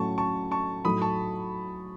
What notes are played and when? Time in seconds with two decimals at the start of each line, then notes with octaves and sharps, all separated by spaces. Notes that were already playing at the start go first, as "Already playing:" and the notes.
Already playing: A2 F#3 A3 C#4 A5 C#6
0.18 A5 C#6
0.51 A5 C#6
0.85 A2 F#3 A3 D#4 A4 B5 D#6
1.02 A5 C#6